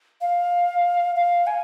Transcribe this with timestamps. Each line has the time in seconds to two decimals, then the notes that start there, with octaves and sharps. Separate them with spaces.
0.21 F5
1.16 F5
1.47 G#5